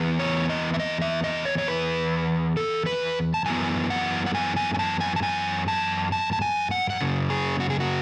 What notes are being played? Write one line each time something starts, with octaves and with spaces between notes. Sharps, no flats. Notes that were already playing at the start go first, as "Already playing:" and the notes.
Already playing: E2 E3 B3
C#5
D#5
E5
D#5
E5
D#5
C#5
C#5
B4
A4
B4
A5
F#2 E3 B3 G#5
F#5
F#5
G#5
G#5
G#5
A5
G#5
A5
G#5
A5
A5
A5
G#5
F#5
F#5
F#2 C#3
G#4
F#4
G#4
F#4